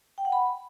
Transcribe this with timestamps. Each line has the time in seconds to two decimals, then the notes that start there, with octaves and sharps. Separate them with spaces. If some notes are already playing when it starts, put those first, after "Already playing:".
0.18 G5
0.25 F#5
0.32 B5